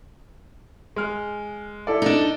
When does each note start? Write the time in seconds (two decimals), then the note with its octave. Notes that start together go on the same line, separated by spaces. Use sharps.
0.96 G#3 F6
1.87 E4 A4 D5
2.02 D4 D#4